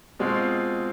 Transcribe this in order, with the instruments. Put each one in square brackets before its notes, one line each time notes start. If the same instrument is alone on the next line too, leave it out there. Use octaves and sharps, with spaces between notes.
[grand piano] B2 G#3 C4 F4